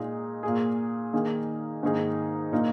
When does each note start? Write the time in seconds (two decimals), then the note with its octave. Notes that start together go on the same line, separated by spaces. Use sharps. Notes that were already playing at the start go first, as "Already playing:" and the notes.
Already playing: A#2 G#3 D#4 G#4
0.43 A#2 A#3 G#4
1.13 D#3 A#3 D#4 G#4
1.83 G#2 D#3 A#3 D#4 G#4
2.52 A#2 A#3 D#4